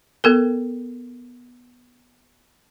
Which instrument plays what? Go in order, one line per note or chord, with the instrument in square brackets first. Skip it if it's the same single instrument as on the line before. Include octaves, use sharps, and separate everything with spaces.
[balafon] B3 A4 A#4